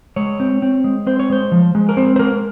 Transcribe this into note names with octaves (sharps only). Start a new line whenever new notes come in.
G#3 C#5
C4
C4
G#3
C4 C5
C#5
G#3 C5
F3
G#3
A#4
C4 C5
C5
G#3 A#4